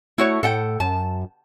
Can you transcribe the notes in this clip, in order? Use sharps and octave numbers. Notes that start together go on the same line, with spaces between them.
A3 E4 F#4 C#5
A2 A4 F#5 G5
F#2 A5